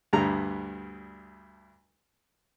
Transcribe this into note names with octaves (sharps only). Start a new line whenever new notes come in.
D2 G2 G3 A#5